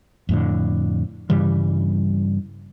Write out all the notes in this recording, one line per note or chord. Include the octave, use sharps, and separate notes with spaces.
F2 A2 D3
G2 C#3 E3 G3